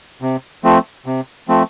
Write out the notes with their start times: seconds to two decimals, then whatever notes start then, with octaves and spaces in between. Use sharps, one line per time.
0.22 C3
0.64 F3 A3 C4
1.06 C3
1.48 F3 A3 C4